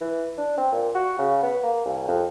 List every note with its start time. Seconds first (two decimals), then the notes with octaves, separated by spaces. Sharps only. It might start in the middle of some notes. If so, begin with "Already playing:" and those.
0.01 E3
0.38 D4
0.58 C4
0.72 A#2
0.95 F#4
1.18 C#3
1.43 B3
1.63 A#3
1.85 C2
2.08 F2